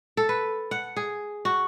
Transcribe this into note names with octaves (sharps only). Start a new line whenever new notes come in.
A4
B4
F#5
G#4
F#4